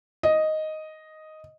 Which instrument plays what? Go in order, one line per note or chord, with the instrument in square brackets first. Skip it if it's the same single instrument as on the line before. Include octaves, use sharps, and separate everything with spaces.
[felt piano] D#5